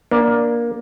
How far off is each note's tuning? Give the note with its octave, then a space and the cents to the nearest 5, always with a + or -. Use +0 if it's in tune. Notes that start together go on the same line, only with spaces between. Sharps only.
A#3 +15 D4 +0